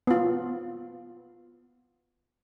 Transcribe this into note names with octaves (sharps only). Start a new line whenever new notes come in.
B3 F4